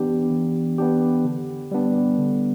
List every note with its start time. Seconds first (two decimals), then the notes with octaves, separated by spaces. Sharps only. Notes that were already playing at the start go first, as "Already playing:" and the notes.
Already playing: E3 B3 D4 G4
0.31 E3
0.78 B3 D4 G4
1.25 D3
1.71 G3 B3 D4
2.19 D3